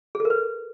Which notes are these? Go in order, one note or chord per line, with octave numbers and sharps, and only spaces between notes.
G#4
A4
A#4
B4